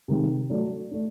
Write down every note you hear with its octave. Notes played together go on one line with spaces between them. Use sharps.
C3 D#3 G#3
F#3 A3 D4
A3 D4